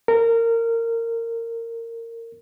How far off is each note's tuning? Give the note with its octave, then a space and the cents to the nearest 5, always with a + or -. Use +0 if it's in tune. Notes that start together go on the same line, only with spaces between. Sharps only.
A#4 -20